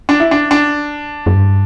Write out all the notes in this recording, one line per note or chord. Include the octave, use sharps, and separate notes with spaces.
D4
E4
D4
D4
F#2
G2